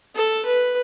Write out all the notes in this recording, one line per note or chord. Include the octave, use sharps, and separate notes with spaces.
A4
B4